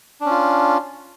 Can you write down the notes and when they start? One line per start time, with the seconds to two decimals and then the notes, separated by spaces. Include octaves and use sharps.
0.21 D4
0.26 C#4
0.31 F4